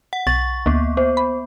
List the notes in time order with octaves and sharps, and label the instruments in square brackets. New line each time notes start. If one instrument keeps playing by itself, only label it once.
[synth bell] F#5
[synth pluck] B1 [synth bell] C#6 [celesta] A6
[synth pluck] D2 [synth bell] A#3 B3
[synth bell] B3 [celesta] C5
[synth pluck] B5